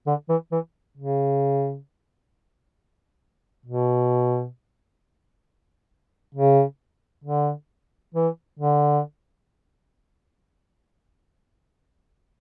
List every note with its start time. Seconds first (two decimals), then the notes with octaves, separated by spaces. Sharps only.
0.07 D3
0.29 E3
0.52 E3
0.97 C#3
3.66 B2
6.35 C#3
7.24 D3
8.15 E3
8.59 D3